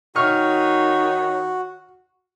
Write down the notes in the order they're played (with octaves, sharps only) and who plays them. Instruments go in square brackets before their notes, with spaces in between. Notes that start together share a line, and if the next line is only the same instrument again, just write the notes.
[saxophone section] D#3 D#4 C#5 [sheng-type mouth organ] F#4 [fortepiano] C#6 F6